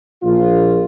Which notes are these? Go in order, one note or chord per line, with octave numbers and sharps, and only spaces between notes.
A#1 F4